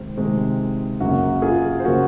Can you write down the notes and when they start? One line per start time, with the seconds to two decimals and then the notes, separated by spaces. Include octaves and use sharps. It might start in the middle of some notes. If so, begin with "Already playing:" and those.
Already playing: C3 D#3 G#3 C4
0.17 C3 D#3 G#3 C4
1.00 F#2 C#3 F#3 A#3 F#4
1.42 F4 G#4
1.80 C5
1.85 C#3 F#3 A#3 F#4 A#4